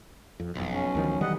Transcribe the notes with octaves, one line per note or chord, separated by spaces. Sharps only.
F2
F#1 B1 F2
C#4
D2 D#3 F3
D#3 E3 G3 D#5 F#5